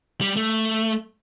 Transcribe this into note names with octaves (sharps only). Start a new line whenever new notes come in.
G3
A3